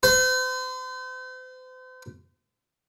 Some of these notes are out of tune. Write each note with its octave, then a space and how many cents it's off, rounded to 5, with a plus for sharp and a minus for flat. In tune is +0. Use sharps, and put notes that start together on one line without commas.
C5 -40